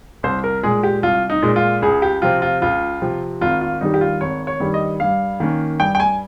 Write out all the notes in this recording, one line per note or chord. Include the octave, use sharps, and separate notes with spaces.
C2 C5
A#4
A#2 G#3 G#4
G4
C2 F4
D#4
A#2 G#3
F4
C#2 G#4
G4
C3 F3 C4 F4
F4
C#2 F4
C3 F3 C4
G#1 F4
F4
G2 D#3 G3 D#4
G4
F4
G#1 C#5
C#5
G2 D#3 G3
D#5
G2 F5
D#3 A#3 C#4
G2 G5
G5
G#5